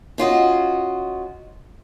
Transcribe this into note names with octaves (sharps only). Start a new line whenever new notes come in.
C#4 F4 F#4 D#5